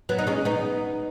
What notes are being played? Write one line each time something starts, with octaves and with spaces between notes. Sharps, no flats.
F#3 B3
D#4
G#3 C#4
B3 D#4